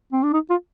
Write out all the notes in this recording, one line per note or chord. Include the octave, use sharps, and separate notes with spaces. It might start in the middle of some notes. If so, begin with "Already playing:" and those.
C4
D4
D#4
F4